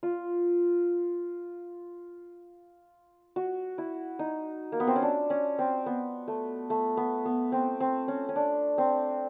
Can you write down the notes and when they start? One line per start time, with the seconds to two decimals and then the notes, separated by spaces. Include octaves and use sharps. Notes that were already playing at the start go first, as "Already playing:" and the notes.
0.03 F4
3.36 F#4
3.78 E4
4.19 D#4
4.72 A#3
4.80 B3
4.87 C4
4.96 C#4
5.02 D4
5.30 C#4
5.59 C4
5.86 B3
6.28 A3
6.70 A3
6.97 B3
7.25 B3
7.52 C4
7.80 C4
8.08 C#4
8.29 C#4
8.36 D4
8.78 C4